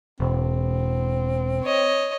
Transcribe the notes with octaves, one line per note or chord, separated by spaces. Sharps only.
E1 C4
C#5 D#5